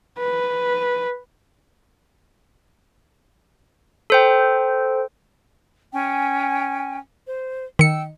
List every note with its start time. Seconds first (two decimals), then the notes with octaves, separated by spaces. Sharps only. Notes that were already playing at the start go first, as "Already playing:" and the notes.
0.19 B4
4.10 A4 C5 G5
5.93 C#4 G5 G#5
7.27 C5
7.79 D#3 G5 E6 C#7